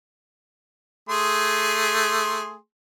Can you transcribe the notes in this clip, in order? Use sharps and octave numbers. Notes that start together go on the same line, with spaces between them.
A3 G#4 C6